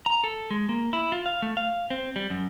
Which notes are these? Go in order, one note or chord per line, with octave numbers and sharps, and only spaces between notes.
A#5
A4
G#3
A#3
E4
F4
F5
A3
F5
C4
G3
F#2